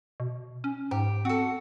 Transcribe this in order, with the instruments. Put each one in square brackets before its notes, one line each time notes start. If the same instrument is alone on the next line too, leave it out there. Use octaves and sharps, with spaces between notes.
[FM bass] B2
C#4
[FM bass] G#2 [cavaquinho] G4
[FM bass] C4 [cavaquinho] F#4 A4